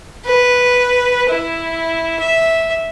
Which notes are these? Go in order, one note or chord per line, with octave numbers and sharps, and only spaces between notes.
B4
E4
E5